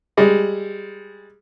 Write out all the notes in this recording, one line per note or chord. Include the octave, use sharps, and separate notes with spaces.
G3 G#3